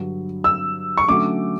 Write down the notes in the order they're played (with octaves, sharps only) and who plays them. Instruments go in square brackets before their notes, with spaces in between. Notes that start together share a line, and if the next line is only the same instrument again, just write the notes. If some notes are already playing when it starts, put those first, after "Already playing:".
Already playing: [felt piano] G2 D3 F#3
[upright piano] E6
C#6
[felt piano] D3 F#3 A3 C#4 [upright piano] D6